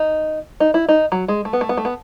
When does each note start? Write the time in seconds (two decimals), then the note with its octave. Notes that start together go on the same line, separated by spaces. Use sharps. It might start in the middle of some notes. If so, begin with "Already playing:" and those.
Already playing: D#4
0.60 D#4
0.74 E4
0.89 D#4
1.12 F#3
1.28 G#3
1.45 A3
1.53 B3
1.61 A3
1.69 B3
1.77 A3
1.85 B3